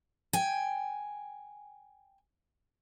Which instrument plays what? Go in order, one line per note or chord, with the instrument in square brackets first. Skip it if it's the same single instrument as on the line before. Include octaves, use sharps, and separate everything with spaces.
[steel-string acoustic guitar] G5 G#5